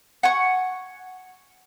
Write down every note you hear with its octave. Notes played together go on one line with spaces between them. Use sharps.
F#5 G#5 C#6